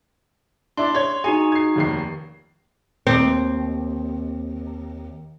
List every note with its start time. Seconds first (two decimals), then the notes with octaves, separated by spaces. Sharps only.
0.77 D4 E4 D5 C6
0.95 C#5 G#6
1.24 D#4 F#4 G#4 G#5
1.52 G#6 C7
1.76 F1 D#2 C7
3.07 D#2 C4